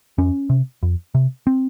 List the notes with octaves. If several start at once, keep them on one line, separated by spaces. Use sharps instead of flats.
F2 C#4
C3
F2
C3
C4